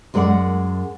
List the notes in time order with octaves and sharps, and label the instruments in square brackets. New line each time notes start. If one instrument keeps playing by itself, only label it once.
[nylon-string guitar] F#2 G#3 A#4 D5 F#5